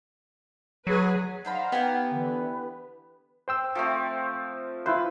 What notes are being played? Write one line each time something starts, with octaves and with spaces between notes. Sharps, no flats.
F#3 G#4 B4
D4 D#4 C5 F5 F#5 A#5 B5
B3 G4 G#5
D3 E3 B4
C5 G5 E6
F3 A3 C4
E4 F4 B4 C5